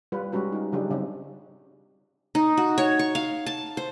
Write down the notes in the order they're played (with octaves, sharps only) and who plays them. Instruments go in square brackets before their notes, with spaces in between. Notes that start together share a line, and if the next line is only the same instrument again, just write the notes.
[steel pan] G3 F4 B4
G3 G#3 C#4 F#4 B4
D#4 F4
C#3 F#3 G3 D4 G4 G#4
C#3 G3 C4 D#4
[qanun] D#4
F#4
C#5
C#6
F5
A5
C5